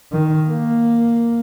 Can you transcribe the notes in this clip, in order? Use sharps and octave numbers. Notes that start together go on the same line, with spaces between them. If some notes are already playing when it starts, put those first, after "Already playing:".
D#3
A#3